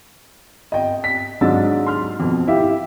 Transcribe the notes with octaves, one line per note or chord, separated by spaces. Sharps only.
D#5 G5
B6
G#2 F#3 G#3 D4 E6 A6
C6 F6
F2 B2
E4 G4 E5 F5